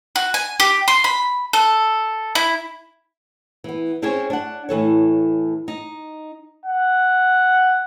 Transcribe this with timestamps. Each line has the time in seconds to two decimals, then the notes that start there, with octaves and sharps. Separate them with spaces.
0.16 F#4
0.34 G#5
0.60 G4
0.88 C6
1.04 B5
1.53 A4
2.35 E4
3.64 E3 B3
4.02 C4 C#4 E4 G#4 C5 C#5
4.30 D4 F#5
4.69 A2 E3 A4 C#5
5.68 D#4
6.66 F#5